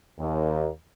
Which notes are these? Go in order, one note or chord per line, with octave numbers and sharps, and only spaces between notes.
D#2